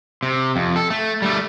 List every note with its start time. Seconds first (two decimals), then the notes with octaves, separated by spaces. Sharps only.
0.23 C3
0.56 F2
0.76 A4
0.90 A3
1.22 G3 A3